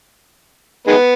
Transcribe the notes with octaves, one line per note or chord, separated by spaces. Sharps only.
D#3 G#3 B3